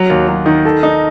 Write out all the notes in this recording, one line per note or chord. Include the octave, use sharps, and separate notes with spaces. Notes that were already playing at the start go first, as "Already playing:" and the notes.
Already playing: F#3
D#2
F#3
D#3
A4
D#4